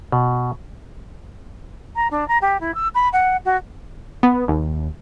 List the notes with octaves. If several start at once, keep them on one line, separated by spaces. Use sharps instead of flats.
B2
A#5
D4
A#5
G4
E4
E6
B5
F#5
F#4
B3
D#2